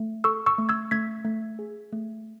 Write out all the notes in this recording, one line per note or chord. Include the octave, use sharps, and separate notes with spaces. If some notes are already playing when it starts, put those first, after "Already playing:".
Already playing: A3
A4 C#6 E6
C#6 E6
A3
E6 G#6
A3 G#6 B6
A3
G#4
A3